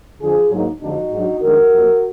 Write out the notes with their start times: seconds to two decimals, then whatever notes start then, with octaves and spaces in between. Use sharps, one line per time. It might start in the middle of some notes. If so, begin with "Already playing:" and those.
0.21 F2 D3 F3 F4 G#4
0.51 G#2 F#3 A#3 D#4
0.81 F2 D3 F3 G#3 D4 D#4 F#4
1.11 G#2 F#3 D4
1.41 F2 D#3 G#3 D4 F#4 A#4
1.71 F2 F3 A#3